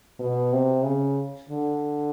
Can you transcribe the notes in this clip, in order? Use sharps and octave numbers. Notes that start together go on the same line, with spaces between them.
B2
C3
C#3
D3